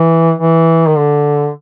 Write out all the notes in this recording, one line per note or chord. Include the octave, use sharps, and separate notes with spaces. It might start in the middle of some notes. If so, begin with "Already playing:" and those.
Already playing: E3
E3
D#3
D3